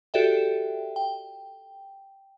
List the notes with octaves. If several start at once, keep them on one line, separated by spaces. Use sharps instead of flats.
F#4 G4 A4 D5 E5 G5
G5